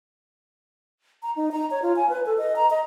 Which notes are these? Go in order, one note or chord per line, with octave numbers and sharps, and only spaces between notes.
A#5
D#4
A#5
C#5
F4
G#5
B4
A4
D#5
A#5
D#5